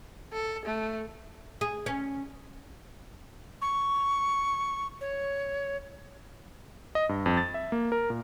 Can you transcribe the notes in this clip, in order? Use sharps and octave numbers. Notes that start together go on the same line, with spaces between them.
A4
A3
G#4
C#4
C#6
C#5
D#5
G2
F2
A6
E5
A#3
A#4
A#2